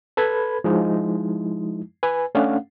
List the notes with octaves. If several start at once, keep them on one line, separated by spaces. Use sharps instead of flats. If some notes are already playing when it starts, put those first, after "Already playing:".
A4 B4 B5 G#6
F3 G#3 D#4 E4
B4 G#5
A3 C#4 D4 F5 F#5